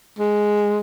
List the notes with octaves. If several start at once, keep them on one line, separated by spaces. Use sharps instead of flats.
G#3